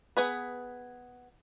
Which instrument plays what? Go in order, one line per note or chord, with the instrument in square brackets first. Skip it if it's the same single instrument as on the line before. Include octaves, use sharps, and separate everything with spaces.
[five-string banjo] B3 G#4 B4